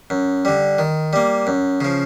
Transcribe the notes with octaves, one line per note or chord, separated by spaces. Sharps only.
F#2
D3 G3
D#3
G3 A#3
F#2
C#3 F3